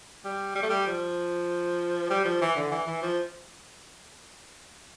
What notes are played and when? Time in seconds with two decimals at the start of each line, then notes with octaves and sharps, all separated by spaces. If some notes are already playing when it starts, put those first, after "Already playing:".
0.25 G3
0.55 G3
0.62 A3
0.69 G3
0.87 F3
2.10 G3
2.25 F3
2.41 E3
2.56 D3
2.71 E3
2.87 E3
3.02 F3